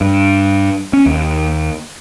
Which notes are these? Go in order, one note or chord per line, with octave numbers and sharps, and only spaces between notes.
G2
C#4
D#2